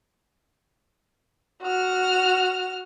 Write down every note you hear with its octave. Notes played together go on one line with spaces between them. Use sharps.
F#4 F6